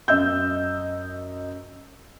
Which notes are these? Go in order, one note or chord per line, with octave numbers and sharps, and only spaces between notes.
F#2 D#5 E6 G6